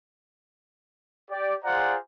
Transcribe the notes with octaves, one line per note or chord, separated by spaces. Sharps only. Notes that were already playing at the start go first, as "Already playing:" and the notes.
G4 D5
F4 G#4 C5 D5 F#5 A#5